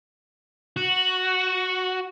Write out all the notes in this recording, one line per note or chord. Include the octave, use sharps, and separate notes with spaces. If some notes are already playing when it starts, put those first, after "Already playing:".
F#4